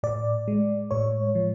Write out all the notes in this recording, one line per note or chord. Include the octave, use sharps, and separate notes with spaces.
A2 D5
G#3
A2 C#5
F3